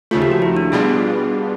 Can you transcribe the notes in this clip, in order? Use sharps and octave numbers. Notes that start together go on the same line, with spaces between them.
D#2 C#3 F3 A3 F4
G4
F#4
E4
D4
B2 G3 B3 D4 F4 G#4